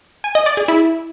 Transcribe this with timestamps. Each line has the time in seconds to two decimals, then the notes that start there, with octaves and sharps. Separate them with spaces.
0.24 G#5
0.35 D#5
0.46 D5
0.57 G#4
0.68 E4